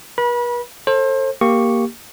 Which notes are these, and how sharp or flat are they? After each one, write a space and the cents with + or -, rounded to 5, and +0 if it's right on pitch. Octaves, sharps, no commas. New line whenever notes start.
B4 -45 B5 -30
A4 +20 C5 +35
A#3 +0 G4 +0 C#6 +0